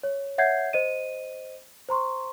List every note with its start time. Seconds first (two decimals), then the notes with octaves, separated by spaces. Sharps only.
0.03 C#5
0.38 C#5 E5 F#5 G6 G#6 C7
0.73 C5 D#5 D#7
1.89 C5 A#5 C6 C#6